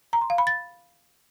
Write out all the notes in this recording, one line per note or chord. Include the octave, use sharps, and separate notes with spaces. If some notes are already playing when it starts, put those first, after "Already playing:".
A#5
C6
F5
B5
A6